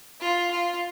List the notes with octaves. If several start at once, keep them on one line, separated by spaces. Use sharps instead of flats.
F4
F4